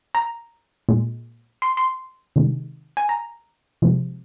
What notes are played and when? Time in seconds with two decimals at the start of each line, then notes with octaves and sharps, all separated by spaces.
0.15 A#5
0.89 A#2 G#3
1.62 C6
1.77 C6
2.36 C3 D#3 G#3
2.97 G#5
3.09 A#5
3.82 C3 F3 G#3